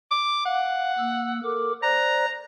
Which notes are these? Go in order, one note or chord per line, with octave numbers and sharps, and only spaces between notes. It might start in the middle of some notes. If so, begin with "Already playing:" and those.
D6
F5 F#5
A#3 E6
A4 A#4 D6
C5 D5 A#5 F#6